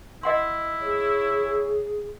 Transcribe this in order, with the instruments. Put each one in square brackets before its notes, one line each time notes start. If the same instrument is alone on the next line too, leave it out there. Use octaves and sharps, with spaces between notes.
[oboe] E4 [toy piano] D#5 F#5 C6
[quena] G#4 [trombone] C#5